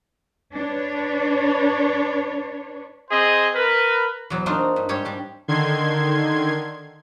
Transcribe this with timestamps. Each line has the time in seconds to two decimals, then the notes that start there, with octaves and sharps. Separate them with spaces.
0.55 D4 B4 C#5
3.11 C4 G#4 C5 D#5
3.55 A#4 B4
4.30 E2 B2 F#3
4.46 A#3 C4 D4 D#4 F4 F#4
4.76 G2
4.89 G#2 G3 G4 C#5
5.05 G3 D4
5.48 D3 D#3 C6 G#6